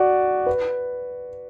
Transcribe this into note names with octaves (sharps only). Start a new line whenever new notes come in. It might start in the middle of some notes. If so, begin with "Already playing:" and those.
Already playing: F#4 D5
B4